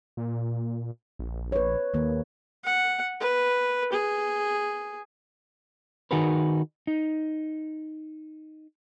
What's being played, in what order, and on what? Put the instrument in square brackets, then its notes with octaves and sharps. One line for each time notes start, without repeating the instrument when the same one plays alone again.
[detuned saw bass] A#2
A#1
[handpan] B4 C#5
[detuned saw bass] D#2 [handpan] D#3 A#3
[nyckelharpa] F#5
B4
G#4
[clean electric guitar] D#3 D#4 F#4 G#4 A#4 B4
D#4